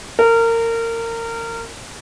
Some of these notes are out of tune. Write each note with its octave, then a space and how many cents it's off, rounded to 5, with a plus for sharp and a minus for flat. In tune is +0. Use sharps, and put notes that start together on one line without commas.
A#4 -25